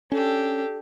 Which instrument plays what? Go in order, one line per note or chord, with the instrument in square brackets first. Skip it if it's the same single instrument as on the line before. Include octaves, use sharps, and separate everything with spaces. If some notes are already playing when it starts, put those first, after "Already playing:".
[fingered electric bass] C#4 [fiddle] D4 G4 [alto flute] A4